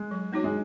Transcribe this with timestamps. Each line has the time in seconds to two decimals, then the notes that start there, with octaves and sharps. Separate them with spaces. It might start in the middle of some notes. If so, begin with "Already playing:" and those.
Already playing: G#3
0.11 F#3
0.33 B3 D#4 F#4 C#5
0.44 G#3